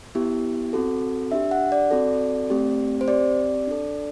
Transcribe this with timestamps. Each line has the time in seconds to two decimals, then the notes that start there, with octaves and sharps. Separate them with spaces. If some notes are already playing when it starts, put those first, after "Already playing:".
0.15 B3 E4 G4
0.73 C4 F#4 A4
1.32 D4 G4 E5
1.51 F#5
1.72 D5
1.91 C4 F#4 A4
2.50 A3 C4 G4
3.01 C5
3.08 C4 G4 D5
3.67 D4 A4